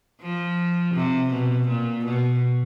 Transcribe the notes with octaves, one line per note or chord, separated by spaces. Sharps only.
F3
C3
B2
A#2
B2